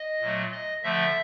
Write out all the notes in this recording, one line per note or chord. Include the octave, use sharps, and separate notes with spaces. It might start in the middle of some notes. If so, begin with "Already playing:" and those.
Already playing: D#5
A#2 F#3 A3
D#5
D3 F3 A3 E5